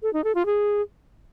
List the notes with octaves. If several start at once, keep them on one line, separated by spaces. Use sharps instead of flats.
A4
D#4
A4
F4
G#4